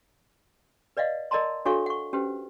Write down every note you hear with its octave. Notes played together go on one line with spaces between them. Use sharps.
B4 D5 D#5 F5 F#5
A#4 D5 D#5 A5 A#5 C6
D4 F#4 A4 C#5 F5 C#6
F#5 C#6
C#4 G4 B4 C5 F#5